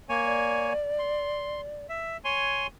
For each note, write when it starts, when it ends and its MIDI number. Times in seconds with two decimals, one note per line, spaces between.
0.09 0.73 58
0.09 0.73 73
0.09 0.73 80
0.26 1.86 74
0.99 1.61 84
1.89 2.17 76
2.25 2.67 73
2.25 2.67 80
2.25 2.67 84